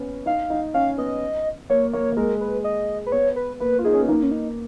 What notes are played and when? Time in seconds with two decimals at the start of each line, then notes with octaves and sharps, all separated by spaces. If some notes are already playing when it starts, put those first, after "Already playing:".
Already playing: B3 C#4
0.26 D#4 F5
0.50 D#4
0.74 C#4 F5
0.98 B3 D#5
1.70 A#3 C#5
1.93 A#3 C#5
2.12 A#3
2.17 G#3 A#4
2.41 B4
2.64 D#5
3.06 B4
3.12 B3 C#5
3.36 B4
3.60 A#3 B4
3.79 F4
3.84 D#4 G#4
3.93 C#4
4.01 B3
4.08 A#3 D#4
4.23 C#4
4.31 D#4